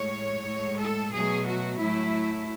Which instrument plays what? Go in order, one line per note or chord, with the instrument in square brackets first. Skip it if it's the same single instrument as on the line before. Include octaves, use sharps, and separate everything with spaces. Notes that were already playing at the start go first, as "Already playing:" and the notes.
Already playing: [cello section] A2 G#3 C#5
A2 G#3
A4
B2 F#3 A3 G#4
F#4
A2 F#3 A3 E4